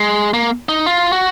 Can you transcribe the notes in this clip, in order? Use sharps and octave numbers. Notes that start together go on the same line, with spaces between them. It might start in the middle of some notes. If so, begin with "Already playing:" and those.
Already playing: G#3
A#3
D#4
F4
F#4